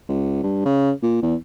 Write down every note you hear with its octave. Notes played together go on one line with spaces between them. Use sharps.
C#2
G2
C#3
A#2
E2